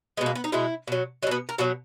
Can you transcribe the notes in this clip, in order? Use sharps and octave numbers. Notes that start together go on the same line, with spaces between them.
B2 G#3 B3
A#3
B3
D#4
B2 G#3 E4
B2 F#3
F#3 D#4
B2 B3
A#4
B2 F#3 F#4